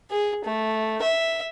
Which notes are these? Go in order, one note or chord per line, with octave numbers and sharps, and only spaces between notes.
G#4
A3
E5